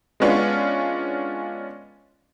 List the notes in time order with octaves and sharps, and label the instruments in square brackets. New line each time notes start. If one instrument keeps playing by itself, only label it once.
[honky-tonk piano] G#3 B3 C#4 D4 F4